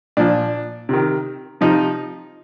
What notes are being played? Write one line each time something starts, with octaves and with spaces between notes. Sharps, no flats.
A#2 F3 D4
C3 D#3
C3 F3 D#4